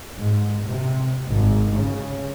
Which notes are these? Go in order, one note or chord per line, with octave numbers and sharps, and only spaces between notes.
G#2
C3
G#1
C#3